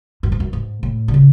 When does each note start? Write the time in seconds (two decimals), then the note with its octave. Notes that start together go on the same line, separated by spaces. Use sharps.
0.23 F#2
0.32 G#2
0.40 F#2
0.53 G#2
0.83 A2
1.08 D3
1.14 C#3